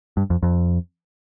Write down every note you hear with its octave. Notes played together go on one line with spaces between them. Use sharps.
G2
F2
F2